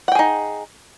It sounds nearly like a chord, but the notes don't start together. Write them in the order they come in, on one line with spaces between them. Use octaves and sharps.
F#5 G5 G#4 D#4